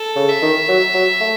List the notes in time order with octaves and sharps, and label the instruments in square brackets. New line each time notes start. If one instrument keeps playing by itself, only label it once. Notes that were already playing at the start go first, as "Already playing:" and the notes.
Already playing: [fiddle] A4
[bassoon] C#3
[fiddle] E5
[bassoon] D#3
F#3
F#3
A3